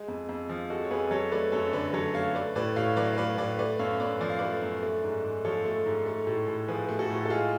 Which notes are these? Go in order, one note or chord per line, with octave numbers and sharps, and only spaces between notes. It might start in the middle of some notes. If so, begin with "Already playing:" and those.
Already playing: G#3
F2
F2
F3
G#3 F#4 A4
C#5
F2 G#4 B4
F#3 A4 C#5
A3 B4 D5
F#2 A4 C#5
D3 B4 D5
F#3 A4 C#5
A3 C#5 F5
A3 B4 D5
A2 B4 D5
A2 C#5 F5
F#3 B4 D5
F5
A3 B4 D5
A2 B4 D5
A3 B4 D5
F#2 C#5 F5
F#2 B4 D5
F3 D5
F5
A3 B4 D5
F#2
A3
G#2
G#2
F3 A4 C#5
A3
G#2
A3
A2
A2
F3 G#4 B4
A3
F#4 A4
A2
A4
G#3 F4 G#4